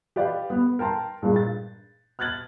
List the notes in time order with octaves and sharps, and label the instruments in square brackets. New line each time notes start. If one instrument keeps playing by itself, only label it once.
[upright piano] G4 B4 D5 D#5 F5 G5
B3
A#4 G5 A5 C6
G2 A#2 G#3
A6
F6 F#6 G#6 A6 F#7